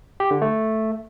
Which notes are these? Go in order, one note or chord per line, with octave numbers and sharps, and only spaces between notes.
G4
D3
A3